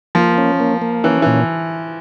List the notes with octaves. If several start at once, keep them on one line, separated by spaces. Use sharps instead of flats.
F3 A#3
C#4
A#3
A#3
E3 C#4
A#2 E3